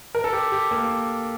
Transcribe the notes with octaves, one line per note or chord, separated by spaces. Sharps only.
A#4
A4
G4
G4
A#3